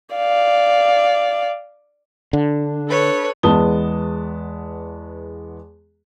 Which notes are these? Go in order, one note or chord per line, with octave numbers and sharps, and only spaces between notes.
D5 F5
D3 D4
A4 B4 C#5
E2 G#3 B3 A5 D#6 G7